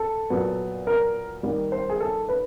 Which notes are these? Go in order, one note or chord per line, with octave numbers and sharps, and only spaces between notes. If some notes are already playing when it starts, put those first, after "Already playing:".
Already playing: A4
A#2 F#3 B3
A#4
D#3 G3 A#3
C5
G#4
A4
B4